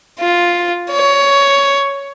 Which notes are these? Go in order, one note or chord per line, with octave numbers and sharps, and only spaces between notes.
F4
C#5